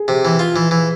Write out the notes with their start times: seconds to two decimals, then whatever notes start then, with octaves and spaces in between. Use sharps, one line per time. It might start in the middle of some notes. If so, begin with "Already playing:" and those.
Already playing: G#4
0.08 C3
0.25 E3
0.39 F4
0.56 E3
0.71 E3